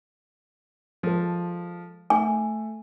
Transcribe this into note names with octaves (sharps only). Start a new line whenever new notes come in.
F3 G#3 A4
A3 G#5